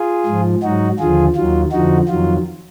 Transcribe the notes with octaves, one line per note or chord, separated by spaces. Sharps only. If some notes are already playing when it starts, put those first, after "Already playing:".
Already playing: F4 G#4
G#2 F3
G#2 F#3 D#4 F#4
D#2 D3 F3 F4 G#4
D#2 D#3 F#3 F4
F2 D3 F3 D#4 F#4
F2 D#3 F#3 F4